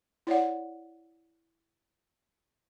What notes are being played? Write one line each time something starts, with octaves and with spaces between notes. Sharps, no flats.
E4 C#5 D5 F#5